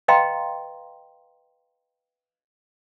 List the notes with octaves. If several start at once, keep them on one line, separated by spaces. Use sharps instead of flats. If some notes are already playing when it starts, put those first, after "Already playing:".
B4 D#5 F5 G5 A#5 C6